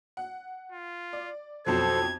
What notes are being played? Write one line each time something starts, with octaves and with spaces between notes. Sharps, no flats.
F#5
F4
D5
B1 F2 F#3 A4 C5 G#6